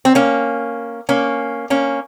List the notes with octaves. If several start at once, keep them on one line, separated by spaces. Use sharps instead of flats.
C4
A#3 C#4
A#3 C#4
A#3 C#4